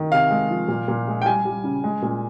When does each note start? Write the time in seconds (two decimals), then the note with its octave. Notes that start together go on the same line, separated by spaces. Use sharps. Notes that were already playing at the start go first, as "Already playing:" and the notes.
Already playing: D#3
0.11 C3 F5
0.31 G#3
0.50 F3
0.68 A#2
0.88 A#2
1.08 G#3
1.22 G5
1.25 G3 G#5
1.45 G3
1.64 C#3
1.84 G#3
2.02 A#2